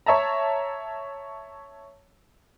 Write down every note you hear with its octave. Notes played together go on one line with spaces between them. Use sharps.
C#5 E5 A5 A#5